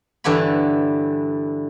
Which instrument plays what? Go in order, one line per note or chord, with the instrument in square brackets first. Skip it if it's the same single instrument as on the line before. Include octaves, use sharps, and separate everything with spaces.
[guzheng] G2 D3 E3 G4 C#5 B5